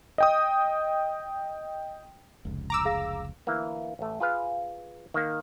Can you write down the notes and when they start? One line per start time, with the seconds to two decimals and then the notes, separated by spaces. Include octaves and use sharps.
0.18 D#5 G5 D#6
2.45 F1 C#2
2.70 A#5 D6 E6
2.85 G#4 F5 A#6
3.47 D2 E3 A#3
3.99 A1 A3
4.20 F4 G#4 B4 F5
5.14 D#3 A#3